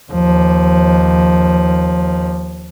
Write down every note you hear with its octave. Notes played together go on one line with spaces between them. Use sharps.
D#2 F3